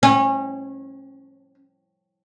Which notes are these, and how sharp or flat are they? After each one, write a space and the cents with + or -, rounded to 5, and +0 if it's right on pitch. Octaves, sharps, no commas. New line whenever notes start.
C#4 -25